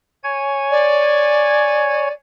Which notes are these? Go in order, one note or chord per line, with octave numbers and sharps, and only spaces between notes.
C#5 G#5 G#6
D5